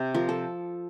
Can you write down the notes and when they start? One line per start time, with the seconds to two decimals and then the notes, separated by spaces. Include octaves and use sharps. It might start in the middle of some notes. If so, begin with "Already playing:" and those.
Already playing: C3
0.15 F3 A#4
0.29 A4